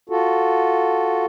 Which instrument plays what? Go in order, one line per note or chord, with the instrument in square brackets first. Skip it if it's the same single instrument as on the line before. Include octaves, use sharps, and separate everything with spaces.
[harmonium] F4 F#4 A4